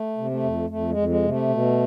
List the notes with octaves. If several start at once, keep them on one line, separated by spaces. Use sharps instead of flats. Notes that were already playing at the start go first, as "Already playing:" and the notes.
Already playing: A3
C3
A3
F2
F2 A3
G#3
F2
G#3
C3
A3
B2